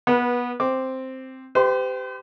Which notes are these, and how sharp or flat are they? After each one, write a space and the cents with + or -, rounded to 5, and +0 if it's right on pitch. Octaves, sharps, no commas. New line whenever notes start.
B3 -15 B4 -30
C4 +0 D6 +0
G4 +0 C5 -45 C6 +0